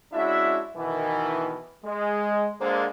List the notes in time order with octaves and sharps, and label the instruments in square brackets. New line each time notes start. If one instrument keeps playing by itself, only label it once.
[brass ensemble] G#3 C#4 D4 E4 F#4 E5
B2 D#3 E3
G#3
D3 G#3 A#3 C5